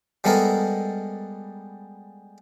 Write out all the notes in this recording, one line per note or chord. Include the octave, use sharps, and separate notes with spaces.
G3 G#3 B3 A4 A#4 E5